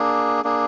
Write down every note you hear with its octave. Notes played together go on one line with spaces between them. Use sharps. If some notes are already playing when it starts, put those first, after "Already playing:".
Already playing: A#3 D4 G#4
A#3 D4 G#4